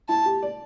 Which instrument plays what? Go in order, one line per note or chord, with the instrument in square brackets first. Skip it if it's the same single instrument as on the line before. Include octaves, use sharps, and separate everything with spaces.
[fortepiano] E4 [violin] A5
[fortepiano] G4
D5